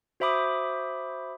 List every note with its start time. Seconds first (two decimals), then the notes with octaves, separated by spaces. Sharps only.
0.20 F#4 C5 E5 B5 D6 D#6